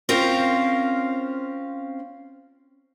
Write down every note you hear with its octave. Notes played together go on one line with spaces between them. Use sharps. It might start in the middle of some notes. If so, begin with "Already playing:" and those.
C4 C#4 F4 A#4 C5